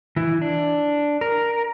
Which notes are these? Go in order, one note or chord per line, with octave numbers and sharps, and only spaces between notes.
E3 E4
D4
A#4